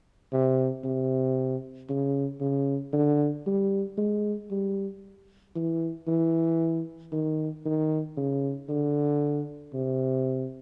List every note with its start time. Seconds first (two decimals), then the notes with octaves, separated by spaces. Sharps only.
0.32 C3
0.84 C3
1.89 C#3
2.40 C#3
2.93 D3
3.46 G3
3.98 G#3
4.51 G3
5.55 E3
6.08 E3
7.12 D#3
7.65 D#3
8.17 C#3
8.69 D3
9.74 C3